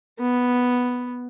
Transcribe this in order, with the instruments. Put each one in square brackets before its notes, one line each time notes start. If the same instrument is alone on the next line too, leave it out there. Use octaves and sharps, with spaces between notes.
[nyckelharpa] B3